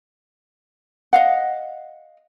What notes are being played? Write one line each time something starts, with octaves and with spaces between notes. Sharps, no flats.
D#5 F5 F#5